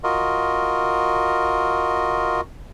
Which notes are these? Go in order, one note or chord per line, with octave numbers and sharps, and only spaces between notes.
F4 F#4 A#4 D#5